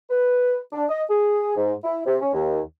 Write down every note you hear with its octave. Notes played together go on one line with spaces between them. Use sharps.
B4
D4
D#5
G#4
G#2
E4
C3
C#4
D#2